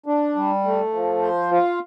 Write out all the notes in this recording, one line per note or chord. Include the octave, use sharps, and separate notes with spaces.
D4
G3
A3
F3
C5
F4